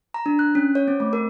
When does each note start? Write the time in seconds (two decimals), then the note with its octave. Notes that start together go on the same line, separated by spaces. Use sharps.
0.14 A#5
0.26 D4
0.39 F#6
0.55 C#4
0.75 C#5
0.88 C4
1.00 A3
1.13 A#4